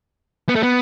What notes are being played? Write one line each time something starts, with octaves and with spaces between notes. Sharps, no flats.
B3
A3
B3